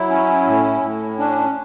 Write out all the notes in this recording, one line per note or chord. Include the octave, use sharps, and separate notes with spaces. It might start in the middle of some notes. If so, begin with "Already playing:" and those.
Already playing: F#3 E4
C#4
A2
A2
C#4 D4